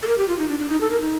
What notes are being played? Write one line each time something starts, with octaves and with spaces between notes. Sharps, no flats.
A4
A#4
G4
F4
D#4
D4
D4
D#4
A4
A#4
D#4